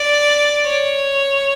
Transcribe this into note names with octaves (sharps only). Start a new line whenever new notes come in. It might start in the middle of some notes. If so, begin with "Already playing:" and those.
Already playing: D5
C#5